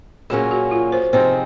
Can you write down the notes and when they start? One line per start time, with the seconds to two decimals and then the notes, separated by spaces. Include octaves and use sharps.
0.30 A#2 F#3 A#3 C#4 G#4
0.51 F#4
0.71 F4
0.92 C5
1.13 C3 F3 C4 D#4 G#4 C5